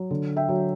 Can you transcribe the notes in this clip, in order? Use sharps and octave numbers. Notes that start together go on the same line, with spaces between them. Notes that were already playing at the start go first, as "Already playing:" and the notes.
Already playing: F#3
D3
E5 G5
F#3